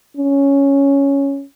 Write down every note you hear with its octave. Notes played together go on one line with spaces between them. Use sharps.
C#4